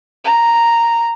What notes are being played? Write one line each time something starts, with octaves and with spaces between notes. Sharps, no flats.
A#5